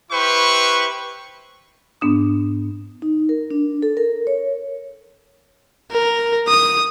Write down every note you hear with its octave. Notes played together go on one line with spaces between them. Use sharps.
E4 G4 B4 C5 C#6
G#2 B3 D4 D#6
D#4
A#4
D4
A4
A#4
C#5
A#4
D#6